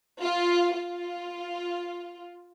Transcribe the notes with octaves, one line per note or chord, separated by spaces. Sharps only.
F4
F4